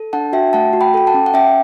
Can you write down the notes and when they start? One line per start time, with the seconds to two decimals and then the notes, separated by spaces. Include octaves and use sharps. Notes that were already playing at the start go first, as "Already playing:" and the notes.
Already playing: A4
0.13 D4 F#5 A5
0.33 F#4 E5 G5
0.53 A3 F#5 A5
0.73 F#4
0.81 G5 B5
0.94 A4 G5
1.07 F#5 A5
1.14 C#4
1.26 F#5
1.34 C#4 E5 G5